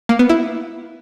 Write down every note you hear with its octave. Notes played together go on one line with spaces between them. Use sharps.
A#3
B3
E4